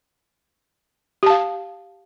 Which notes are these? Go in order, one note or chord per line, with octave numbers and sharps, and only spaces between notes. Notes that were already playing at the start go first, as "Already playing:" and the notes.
G4 F5 A5